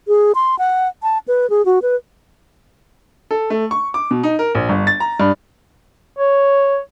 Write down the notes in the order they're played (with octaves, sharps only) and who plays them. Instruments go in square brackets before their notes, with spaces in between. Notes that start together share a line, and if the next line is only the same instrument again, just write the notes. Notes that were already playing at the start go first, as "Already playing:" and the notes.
[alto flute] G#4
C6
F#5
A5
B4
G#4
F#4
B4
[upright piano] A4
A3
C#6
D6
B2
D#4
A#4
A#1
G1
A6
A#5
G2
[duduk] C#5